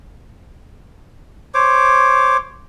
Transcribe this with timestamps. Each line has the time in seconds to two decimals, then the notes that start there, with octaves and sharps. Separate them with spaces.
1.54 C5 C#5 D6